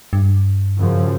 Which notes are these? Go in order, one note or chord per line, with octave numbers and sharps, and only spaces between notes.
G2
F#2 C#3 F3